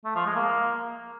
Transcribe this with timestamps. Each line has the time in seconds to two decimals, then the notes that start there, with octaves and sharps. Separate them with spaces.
0.05 A3
0.15 F3
0.26 G#3
0.36 A#3